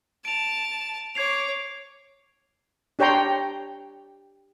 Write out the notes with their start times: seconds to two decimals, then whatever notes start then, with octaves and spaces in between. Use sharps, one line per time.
0.25 A5 D7 F7
1.15 C#5 D6 G#6 C7 F7
2.99 D4 G4 C#5 G5 A#5 C6